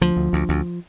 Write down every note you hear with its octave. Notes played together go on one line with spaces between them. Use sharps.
D2 F3
D2
D2
D2